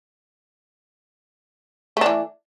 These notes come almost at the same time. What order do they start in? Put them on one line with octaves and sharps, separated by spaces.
A3 D4 E3